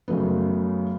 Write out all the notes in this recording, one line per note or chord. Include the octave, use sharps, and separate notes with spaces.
F#2 C#3 F#3 A3 B3